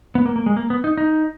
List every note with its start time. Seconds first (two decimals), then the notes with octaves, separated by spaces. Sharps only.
0.15 B3
0.26 A#3
0.36 A#3
0.46 G#3
0.57 A#3
0.70 B3
0.84 D#4
0.97 D#4